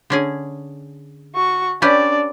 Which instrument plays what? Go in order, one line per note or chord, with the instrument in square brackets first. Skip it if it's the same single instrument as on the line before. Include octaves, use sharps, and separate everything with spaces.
[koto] D3 C#4 G#4
[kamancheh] F#4 C#6
[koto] C#4 G4 B4 [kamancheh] D4 D5